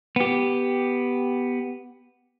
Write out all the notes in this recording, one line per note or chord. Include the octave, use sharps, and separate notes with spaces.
B3 G4